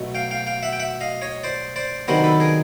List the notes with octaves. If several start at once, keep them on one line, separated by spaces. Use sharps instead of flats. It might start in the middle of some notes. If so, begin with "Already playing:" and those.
Already playing: B2 F#3 A3
F5 G5
F5 G5
F5 G5
E5 F#5
G5
E5 F#5
D#5 F5
C#5 D#5
C5 D5
C5 D5
C3 D#3 F#3 B3 D4 A#4 C5
A4 B4
G#4 A#4